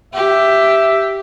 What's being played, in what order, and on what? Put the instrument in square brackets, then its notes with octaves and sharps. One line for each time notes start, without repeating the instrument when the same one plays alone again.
[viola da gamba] G4 [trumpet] E5